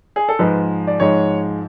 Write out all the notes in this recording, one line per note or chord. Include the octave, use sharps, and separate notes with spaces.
G#4
A4
G#2 F3 G#3 B4
D5
G#2 F3 G#3 C#5